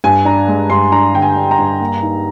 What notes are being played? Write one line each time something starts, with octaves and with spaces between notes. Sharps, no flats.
G2 G#5
D4 A#5
G#3
G2 C6
D4 A#5
D3 G5
G#5
D4
A#5
G2
A#3
D#4